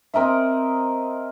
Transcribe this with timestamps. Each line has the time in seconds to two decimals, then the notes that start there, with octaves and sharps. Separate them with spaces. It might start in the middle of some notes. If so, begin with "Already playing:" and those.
0.14 C4 A#4 D#5 E5